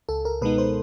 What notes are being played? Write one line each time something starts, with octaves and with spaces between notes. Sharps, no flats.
C#2 A4
A#4
B2 G#3 B3 D#4 B4
C5